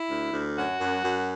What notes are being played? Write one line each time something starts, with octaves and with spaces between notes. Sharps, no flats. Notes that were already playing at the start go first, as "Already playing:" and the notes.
Already playing: E4
D2
D2
F#2 F#4
F#2
F#2